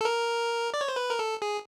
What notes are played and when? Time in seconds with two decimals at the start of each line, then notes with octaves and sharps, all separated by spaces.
0.01 A4
0.05 A#4
0.74 D5
0.81 C#5
0.88 C5
0.96 B4
1.10 A#4
1.19 A4
1.42 G#4